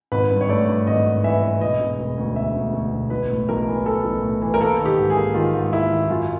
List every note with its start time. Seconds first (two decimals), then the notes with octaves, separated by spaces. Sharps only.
0.12 G#1 B4
0.31 G2
0.41 C#5
0.49 A3 D5
0.69 G2
0.87 G#1 D#5
1.06 G#1
1.24 E3 E5
1.42 E3
1.61 E1 D#5
1.80 E1
1.99 E1
2.17 D2
2.36 E1 E5
2.55 D2
2.73 D2
2.93 E1
3.10 B1 B4
3.30 A2
3.49 B1 A#4
3.67 E3
3.86 E3 A4
4.04 B1
4.22 A2
4.42 E3
4.54 A#4
4.60 A#3 A4
4.79 D#3
4.86 G4
4.97 G#2
5.10 G#4
5.17 A#3
5.34 D#3 F4
5.53 G#2
5.72 A#3 E4
5.90 D#3
6.09 F#2 F4